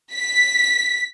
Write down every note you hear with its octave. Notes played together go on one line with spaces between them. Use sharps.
B6